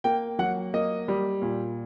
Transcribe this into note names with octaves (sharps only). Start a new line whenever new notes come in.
A#3 G5
F#3 F#5
A#3 D#5
G3
A#2